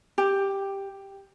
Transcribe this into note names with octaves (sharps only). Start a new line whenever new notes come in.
G4